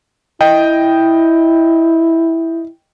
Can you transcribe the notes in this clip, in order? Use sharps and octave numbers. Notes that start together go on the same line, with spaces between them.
E4 D#5 G5